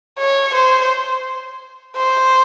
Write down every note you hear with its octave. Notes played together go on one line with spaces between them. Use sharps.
C#5
C5
C5